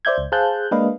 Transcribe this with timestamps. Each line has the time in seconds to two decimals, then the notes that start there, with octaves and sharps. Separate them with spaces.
0.05 C5 D5 E5 G6 G#6
0.18 C#2
0.32 G#4 C5 F5 A5 F#6 G6
0.71 G#3 A#3 D4 B4 D#5 F5